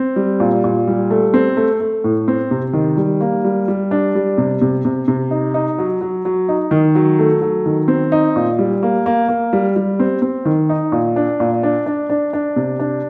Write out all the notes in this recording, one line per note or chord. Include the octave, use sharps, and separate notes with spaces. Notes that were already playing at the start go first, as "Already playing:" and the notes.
Already playing: C4
G3
A#2
A#2
G3
A3
C4
A3
A3
A2
C4
C3
D#3
G3
A#3
G3
G3
D4
G3
C3
C3
C3
C3
D#4
D#4
F#3
F#3
F#3
D#4
D#3
F#3
A3
F#3
D#3
C4
D#4
A#2
G3
A#3
A#3
A#3
G3
G3
C4
C4
D#3
D#4
A#2
D4
A#2
D4
D4
D4
D4
C3
D4